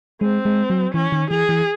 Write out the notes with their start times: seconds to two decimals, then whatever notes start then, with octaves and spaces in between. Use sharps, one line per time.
0.21 G#3 C4
0.45 G#3
0.70 F#3
0.94 E3 C#4
1.12 D#3
1.30 E3 G#4
1.49 E3